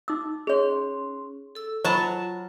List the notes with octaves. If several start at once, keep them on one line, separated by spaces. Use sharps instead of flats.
D#4 D6 E6
C#4 G#4 C#5 C6
A4 E6
F#3 F4 C5 A5 B5